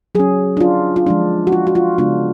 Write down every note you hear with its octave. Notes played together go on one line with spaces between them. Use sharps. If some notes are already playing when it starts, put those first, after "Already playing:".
F#3 C#4 G#4
D4
F4
F4
F3 G#3 D4
F#4
F4
F#4
F4
C#3 G#3 B3 D4 F4